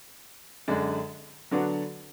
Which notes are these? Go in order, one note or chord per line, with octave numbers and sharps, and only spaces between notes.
F#2 D3 G#3 D4
D3 F#3 B3 D4 F#4